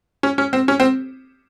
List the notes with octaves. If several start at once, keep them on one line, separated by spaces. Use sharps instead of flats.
C#4
C#4
C4
C#4
C4